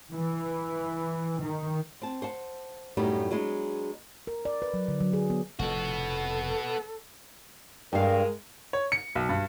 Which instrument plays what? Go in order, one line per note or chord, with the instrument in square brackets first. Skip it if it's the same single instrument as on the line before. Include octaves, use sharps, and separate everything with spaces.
[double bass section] E3
D#3
[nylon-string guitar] C4 A5
C5 F#5 A5
F#2 A2 G3 B3 D#4
F#3 G#3 B3 C4 D4
[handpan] A#4
D5
B4
F#3
D3
F#3
G#4
B3
[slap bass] F1 F2 A2 [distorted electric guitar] B3 F#4 [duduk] A4
[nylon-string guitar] G2 F5 [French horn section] G#3 A#4
[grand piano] C#5
C#7
B1
G2